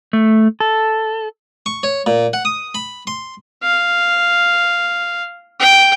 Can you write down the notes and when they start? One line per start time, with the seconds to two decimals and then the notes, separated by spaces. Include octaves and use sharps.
0.13 A3
0.60 A4
1.66 C#6
1.83 C#5
2.06 A#2
2.33 F#5
2.45 D#6
2.75 B5
3.07 C6
3.63 F5
5.59 G5